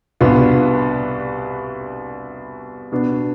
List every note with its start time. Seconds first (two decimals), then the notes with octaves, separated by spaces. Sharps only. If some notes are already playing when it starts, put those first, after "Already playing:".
0.21 C2 B2 B3 D4 F4
2.92 B2 B3 D4